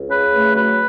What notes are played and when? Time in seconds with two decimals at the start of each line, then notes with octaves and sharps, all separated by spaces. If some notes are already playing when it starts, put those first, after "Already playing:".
Already playing: C#2
0.09 C#3 B4
0.32 A3
0.55 F#3 B4